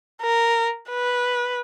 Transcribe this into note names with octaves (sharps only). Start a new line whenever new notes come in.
A#4
B4